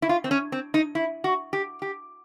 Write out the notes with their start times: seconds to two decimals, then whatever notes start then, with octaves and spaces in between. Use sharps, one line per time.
0.02 E4
0.09 F4
0.24 C4
0.31 C#4
0.52 C4
0.74 D#4
0.95 E4
1.24 F#4
1.53 G4
1.82 G4